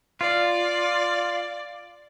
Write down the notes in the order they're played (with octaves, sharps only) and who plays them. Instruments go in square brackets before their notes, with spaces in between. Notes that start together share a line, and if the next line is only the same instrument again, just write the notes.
[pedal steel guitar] F4 [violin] D5